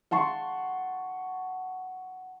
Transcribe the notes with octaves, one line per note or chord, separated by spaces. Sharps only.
F#5 A5 C6 C#6